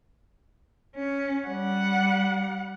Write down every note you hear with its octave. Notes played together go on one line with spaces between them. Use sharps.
C#4
G3 F#5